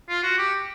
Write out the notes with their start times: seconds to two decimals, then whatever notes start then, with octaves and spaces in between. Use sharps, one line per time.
0.09 F4
0.23 F#4
0.38 G4